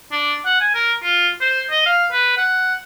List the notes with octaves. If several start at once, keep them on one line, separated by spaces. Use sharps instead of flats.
D4
F#5
G#5
A#4
F4
C5
D#5
F5
B4
F#5